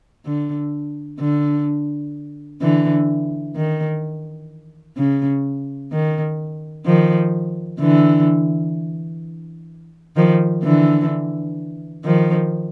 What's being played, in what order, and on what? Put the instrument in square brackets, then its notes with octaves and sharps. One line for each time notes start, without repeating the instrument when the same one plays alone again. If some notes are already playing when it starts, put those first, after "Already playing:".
[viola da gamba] D3
D3
D3 E3
D#3
C#3
D#3
D#3 F3
D3 E3
D#3 F3
D3 E3
D#3 F3